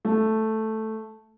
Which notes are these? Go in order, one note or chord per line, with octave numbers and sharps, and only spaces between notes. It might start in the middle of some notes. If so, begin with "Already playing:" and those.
A3